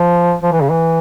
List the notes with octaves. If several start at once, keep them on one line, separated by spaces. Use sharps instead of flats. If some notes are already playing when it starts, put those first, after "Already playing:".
Already playing: F3
F3
E3
C#3
E3